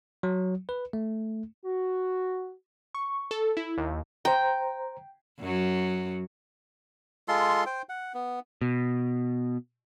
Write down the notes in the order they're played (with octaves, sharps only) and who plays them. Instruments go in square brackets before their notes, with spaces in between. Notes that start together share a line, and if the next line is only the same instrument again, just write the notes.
[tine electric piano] F#3
B4
A3
[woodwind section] F#4
[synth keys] C#6
A4
E4
D#2
[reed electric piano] C5 A#5 [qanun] G5
[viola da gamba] F#2 F#3
[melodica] G#3 F4 A4 C6
C5 G5
F#5
B3
[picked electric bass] B2